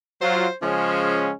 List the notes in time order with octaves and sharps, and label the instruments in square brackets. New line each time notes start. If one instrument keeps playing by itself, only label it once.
[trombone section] F#3 F4 [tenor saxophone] C5
[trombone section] C#3 G#3 C#4 [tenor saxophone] F3